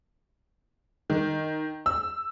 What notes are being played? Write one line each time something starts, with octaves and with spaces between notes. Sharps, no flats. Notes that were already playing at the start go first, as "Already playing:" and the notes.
D#3
E6